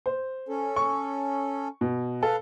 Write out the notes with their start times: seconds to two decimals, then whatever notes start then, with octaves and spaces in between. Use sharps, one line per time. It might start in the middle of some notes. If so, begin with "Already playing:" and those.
0.06 C5
0.49 C#4 A4
0.76 C#6
1.81 B2
2.23 A4 B4 F5